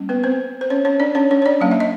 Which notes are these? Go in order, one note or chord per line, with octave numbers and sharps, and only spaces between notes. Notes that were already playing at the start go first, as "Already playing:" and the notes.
Already playing: G3 A#3 C#4
B3 B4
C4 C5
C5
C#4 C#5
C#4 C#5
D4 D5
C#4 C#5
C#4 C#5
C#5
D4 D5
F#3 A#3 C#4 F5
E5
D#5